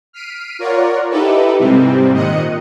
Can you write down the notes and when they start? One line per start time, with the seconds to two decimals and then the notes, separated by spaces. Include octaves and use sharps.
0.13 F6 B6 C7 D7 D#7
0.59 F4 A#4 C#5 D5 F#5
1.10 D#4 E4 G4 A4 B4
1.59 G#2 C3 G3 C4
2.13 A#2 D#3 D#5 F#6 C#7 D#7